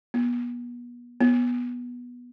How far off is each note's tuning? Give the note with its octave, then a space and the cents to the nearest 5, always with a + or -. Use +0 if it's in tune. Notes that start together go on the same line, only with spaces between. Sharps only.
B3 -35
B3 -15